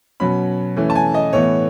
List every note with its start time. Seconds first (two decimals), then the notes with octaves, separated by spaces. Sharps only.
0.20 B2 F#3 C#4 B5
0.76 E3 A3 C#4
0.90 A5
0.95 G#5
1.14 D#5
1.33 A2 E3 B3 C#5